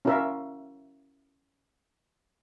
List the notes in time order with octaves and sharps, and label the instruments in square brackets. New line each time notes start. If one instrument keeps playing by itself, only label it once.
[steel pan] C#4 E4 F#4 A#4 E5 F5